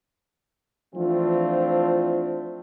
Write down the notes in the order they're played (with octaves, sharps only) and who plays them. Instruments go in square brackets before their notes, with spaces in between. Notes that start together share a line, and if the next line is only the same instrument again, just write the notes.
[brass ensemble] E3 F3 A3 C4 D4 F4